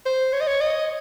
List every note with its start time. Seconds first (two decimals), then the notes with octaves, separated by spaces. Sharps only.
0.06 C5
0.33 C#5
0.41 D#5
0.48 C#5
0.61 D#5